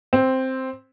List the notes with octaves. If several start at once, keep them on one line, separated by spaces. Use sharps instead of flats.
C4